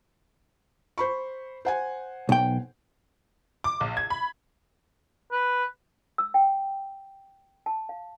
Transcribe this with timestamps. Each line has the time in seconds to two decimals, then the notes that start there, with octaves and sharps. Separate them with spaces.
0.98 C5 B5 C#6
1.65 C5 F#5 G#5
2.29 B1 G5
3.64 D6
3.81 A#1
3.97 G#6
4.10 B5
5.32 B4
6.18 E6
6.34 G5
7.66 A5
7.89 F5